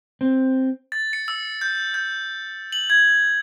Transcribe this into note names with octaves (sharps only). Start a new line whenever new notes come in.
C4
A6
C#7
E6
G6
G6
F#7
G#6